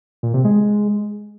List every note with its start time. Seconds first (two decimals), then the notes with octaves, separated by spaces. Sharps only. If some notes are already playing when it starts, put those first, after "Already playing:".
0.23 A#2
0.34 C3
0.45 G#3